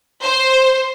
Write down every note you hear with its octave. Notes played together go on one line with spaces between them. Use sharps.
C5